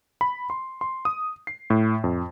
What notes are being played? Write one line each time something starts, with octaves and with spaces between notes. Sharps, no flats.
B5
C6
C6
D#6
C7
A2
F2